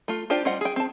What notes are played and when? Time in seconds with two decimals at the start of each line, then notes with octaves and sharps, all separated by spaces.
0.08 A3 F4
0.30 D4 F4 G4 C5 D5
0.45 G3 F4 C5 D#5 F#5
0.61 G#4 G5
0.76 C4 A5